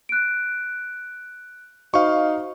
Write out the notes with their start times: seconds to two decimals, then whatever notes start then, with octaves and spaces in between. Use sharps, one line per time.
0.09 F#6 D7
1.94 D#4 F#4 C5 F5 C#6